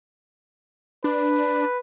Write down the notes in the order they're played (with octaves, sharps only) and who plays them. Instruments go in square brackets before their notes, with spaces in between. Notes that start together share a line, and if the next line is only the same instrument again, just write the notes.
[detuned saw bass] D4 [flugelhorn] B4